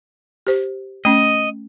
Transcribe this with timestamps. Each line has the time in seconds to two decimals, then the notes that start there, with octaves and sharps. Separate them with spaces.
0.47 G4 C5
1.05 A3 C#4 D#5